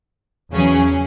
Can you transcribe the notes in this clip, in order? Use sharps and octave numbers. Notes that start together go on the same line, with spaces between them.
E2 C#3 F#3 C#4 G#4